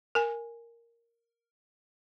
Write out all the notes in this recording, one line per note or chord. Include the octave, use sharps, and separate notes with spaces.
A#4 G#5